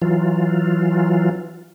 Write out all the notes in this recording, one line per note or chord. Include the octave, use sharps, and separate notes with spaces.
E3 F#3 F4